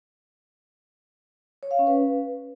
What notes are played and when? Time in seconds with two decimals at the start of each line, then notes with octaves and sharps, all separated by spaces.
1.63 C#5
1.71 F5
1.79 C#4
1.87 B4